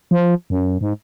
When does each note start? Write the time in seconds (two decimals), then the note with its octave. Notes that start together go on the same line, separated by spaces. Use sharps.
0.11 F3
0.50 F#2
0.81 G#2